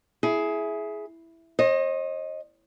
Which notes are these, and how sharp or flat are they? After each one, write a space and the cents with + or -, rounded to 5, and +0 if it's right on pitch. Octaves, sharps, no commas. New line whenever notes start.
E4 +0 G#4 +15
C5 +45 D#5 +0